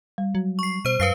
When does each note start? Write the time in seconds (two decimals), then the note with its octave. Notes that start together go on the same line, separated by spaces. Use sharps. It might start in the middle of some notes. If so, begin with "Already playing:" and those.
0.18 G3
0.35 F#3
0.59 C#6 C7
0.85 B2 C5 D#7
1.00 F#2 B4 F5 C7